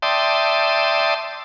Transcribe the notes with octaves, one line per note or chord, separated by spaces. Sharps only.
D5 E5 G5 A5 C6 D#6